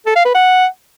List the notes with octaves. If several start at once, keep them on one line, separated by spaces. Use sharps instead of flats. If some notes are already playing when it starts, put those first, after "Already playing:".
A4
F5
B4
F#5